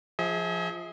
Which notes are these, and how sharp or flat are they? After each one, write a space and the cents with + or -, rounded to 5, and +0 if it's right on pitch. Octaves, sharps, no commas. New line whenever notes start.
F3 +0 G#4 +0 E5 -45